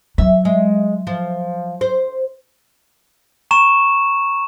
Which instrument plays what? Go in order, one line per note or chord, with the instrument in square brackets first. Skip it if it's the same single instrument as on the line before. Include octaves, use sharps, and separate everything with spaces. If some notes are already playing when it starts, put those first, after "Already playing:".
[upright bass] F#3 [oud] E5
[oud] G#3
F3
C5
[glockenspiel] A#5 C#6 E7